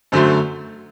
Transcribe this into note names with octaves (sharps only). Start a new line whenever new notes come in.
F#2 D3 F#3 A3 C5